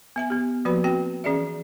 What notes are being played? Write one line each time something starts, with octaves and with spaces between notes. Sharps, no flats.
B3 E5 G#5
B3 G4
F3 A#3 F#4 B4 B5
C4 F#4 G5
E3 C#4 G#4 D5 E5